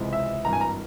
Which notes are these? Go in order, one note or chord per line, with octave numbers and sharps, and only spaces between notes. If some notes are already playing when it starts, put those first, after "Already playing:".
Already playing: C#2 C3 E3 G#3
E5
G#1 G2 E3 A#5
G#5
A#5